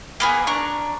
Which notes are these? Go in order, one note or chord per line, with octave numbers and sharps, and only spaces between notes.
A#3 B3 G#4
D4 A#5 C#6